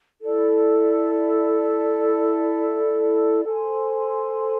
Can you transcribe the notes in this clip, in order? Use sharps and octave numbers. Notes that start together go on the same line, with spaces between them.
E4 A4 D5
A4 C5 G#5 C6